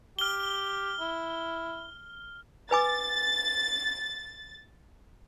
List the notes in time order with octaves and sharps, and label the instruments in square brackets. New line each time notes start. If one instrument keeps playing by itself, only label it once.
[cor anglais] G4 [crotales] F6 G7
[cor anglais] E4
[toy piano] B4 G#5 D6 [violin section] A6